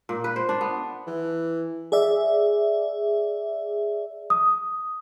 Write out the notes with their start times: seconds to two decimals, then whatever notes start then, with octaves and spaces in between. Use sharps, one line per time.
0.09 A#2
0.24 B4
0.36 C5
0.49 D4
0.61 B3
1.07 E3
1.92 G#4 D5 E5
4.30 D#6